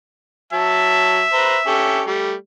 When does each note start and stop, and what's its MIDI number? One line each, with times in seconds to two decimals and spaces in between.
0.53 1.23 54
0.53 2.01 76
0.53 1.23 81
1.33 1.57 71
1.33 1.57 72
1.33 1.57 82
1.67 2.02 61
1.67 2.02 67
1.67 2.02 69
2.07 2.34 55
2.07 2.34 57